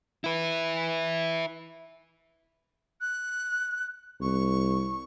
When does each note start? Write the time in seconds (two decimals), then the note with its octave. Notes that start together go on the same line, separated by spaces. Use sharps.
0.24 E4 B4
3.01 F#6
4.21 C2 C#6